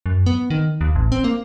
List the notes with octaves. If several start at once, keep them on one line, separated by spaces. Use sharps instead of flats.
F#2
B3
D#3
D#2
A1
C4
A#3